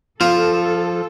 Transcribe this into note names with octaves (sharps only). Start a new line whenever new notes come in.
F3 F4 A4